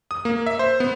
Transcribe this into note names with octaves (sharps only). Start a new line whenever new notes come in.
D#6
A#3
E5
C5
B3